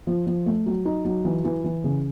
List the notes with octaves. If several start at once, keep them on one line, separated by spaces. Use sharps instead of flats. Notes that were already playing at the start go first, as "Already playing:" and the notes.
F3
F3
A3
F#3
D#4
F#3
E3
E3
E3
C#3